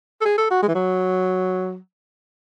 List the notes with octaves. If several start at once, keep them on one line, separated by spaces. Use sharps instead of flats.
A4
G#4
A4
F#4
G#3
E3
F#3